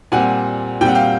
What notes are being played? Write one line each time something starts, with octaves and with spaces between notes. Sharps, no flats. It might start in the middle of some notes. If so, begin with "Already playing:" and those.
A#2 G3 C4 F#5 G#5
A#2 G3 C4 G5
F#5
F5 G5